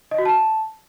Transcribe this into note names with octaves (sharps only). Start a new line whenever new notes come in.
D#5
F#4
A5